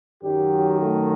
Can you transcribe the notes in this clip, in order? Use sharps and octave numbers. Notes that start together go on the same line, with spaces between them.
F#2 D#3 F#3 G4
A3